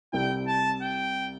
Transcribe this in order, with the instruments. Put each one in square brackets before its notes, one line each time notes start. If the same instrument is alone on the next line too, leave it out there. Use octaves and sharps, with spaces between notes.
[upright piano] C2 C3 G3 E4 [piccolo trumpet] G5
[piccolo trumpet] A5
G5